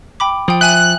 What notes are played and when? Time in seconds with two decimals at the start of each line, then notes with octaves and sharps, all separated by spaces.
0.20 G5 B5 D6
0.48 F3 G5 D#6
0.61 E5 G#5 F#6 F#7
0.73 F#6